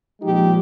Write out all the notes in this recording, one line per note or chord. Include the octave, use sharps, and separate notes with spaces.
A#2 F3 G#3 D#4 G4